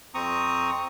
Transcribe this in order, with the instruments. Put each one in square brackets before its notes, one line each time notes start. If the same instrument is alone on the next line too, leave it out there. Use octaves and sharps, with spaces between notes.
[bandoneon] F2 C4 A#5 C#6 D#6